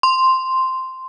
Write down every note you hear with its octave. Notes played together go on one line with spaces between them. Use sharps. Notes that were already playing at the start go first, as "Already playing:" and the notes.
C6